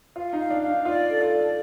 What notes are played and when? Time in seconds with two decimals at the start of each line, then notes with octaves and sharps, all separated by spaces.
0.16 F4 F5
0.33 D#4
0.39 F5
0.50 D4
0.62 F5
0.68 D#4
0.85 F4 D5
1.09 A4
1.21 F4
1.33 D5